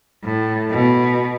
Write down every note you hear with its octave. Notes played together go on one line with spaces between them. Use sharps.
A2
B2